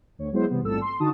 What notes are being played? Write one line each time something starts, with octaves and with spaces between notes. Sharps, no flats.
D2 C#5
F#3 G#3 B3 E4 C5
C3 E3 G3 B3
A1 F2 G#2 G3 A4 E6
C6
D3 D#4 F#4 A5 D#6